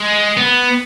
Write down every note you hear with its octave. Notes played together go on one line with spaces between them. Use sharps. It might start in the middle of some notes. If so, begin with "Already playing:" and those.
Already playing: G#3
B3